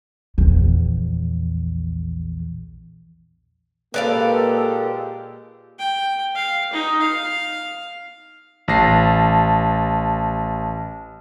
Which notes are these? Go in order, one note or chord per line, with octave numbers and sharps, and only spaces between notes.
A#1 E2
A#2 G#3 A#3 G4 A4 B4 D5 F5
G5
F5
D#4
F5
A1 A5 A#6 C7